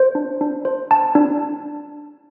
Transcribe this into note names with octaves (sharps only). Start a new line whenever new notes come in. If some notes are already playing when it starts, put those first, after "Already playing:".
Already playing: C5
D4
D4
C5
A5
D4